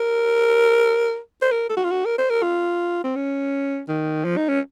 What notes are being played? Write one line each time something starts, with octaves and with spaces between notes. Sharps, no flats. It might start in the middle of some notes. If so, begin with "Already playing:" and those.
Already playing: A#4
C5
A#4
A4
F#4
F4
F#4
A#4
C5
A#4
F4
C4
C#4
D#3
F3
D#4
C#4